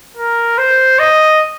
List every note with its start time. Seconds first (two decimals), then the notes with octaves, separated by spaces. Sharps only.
0.17 A#4
0.58 C5
0.99 D#5